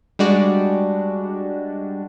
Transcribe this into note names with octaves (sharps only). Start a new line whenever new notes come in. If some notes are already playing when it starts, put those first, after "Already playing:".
G3 G#3 D4 F#4